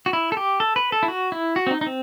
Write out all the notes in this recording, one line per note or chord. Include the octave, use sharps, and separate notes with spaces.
F#4
E4
A4
G4
A4
B4
A4
E4
F#4
E4
F#4
C4
D#4
D#4
C4